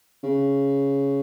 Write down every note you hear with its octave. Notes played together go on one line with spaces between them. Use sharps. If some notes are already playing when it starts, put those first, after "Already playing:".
C#3